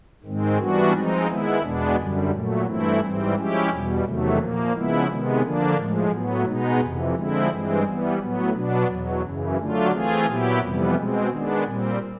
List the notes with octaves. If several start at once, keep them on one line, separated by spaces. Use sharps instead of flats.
G#2 D#3 G#3 C4
E3 G3 B3 D4 F#4
F3 G#3 C4 D#4
D#3 G#3 B3 E4
E2 B2 G#3 B3 D4
F#2 D3 G3
A#2 F#3 A3
G2 E3 A3 C4 E4
G#2 E3 G3 C4
F3 G#3 C#4 E4 G4
E2 B2 G3
E2 C3 D#3 F#3 A3
A#2 F3 A#3
C#3 F3 G#3 B3 E4
C3 D#3 G#3 B3
D3 F3 A#3 D4
A2 F3 G#3
A2 F#3 B3
B2 G#3 B3 D#4
F2 C3 E3
D3 F3 G#3 C4 E4
G2 E3 G#3 C4
E3 G3 B3
A2 F#3 B3
B2 F#3 B3 D4
E2 B2 F#3
F#2 C#3 E3
D3 F#3 A3 D4 F4
E3 A3 C4 F4 G#4
A#2 F#3 B3 E4 G4
F2 C3 E3 G3 B3
B2 G#3 C4
D#3 G#3 B3 D4
A#2 G3 C4